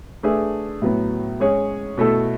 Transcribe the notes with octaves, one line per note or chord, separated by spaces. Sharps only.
A3 D4 G#4 B4 E5
A2 F#3 B3
G#3 C#4 G#4 C#5
B2 A3 E4 A4